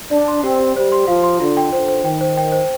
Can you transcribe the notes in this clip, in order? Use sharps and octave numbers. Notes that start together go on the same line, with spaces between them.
D4 D5
C6
C4 G4
G4
G3 C5
C6
F3 F5
C6
D3 F4
G5
D3 C5
C5
D#3 G5
C5
G5
C5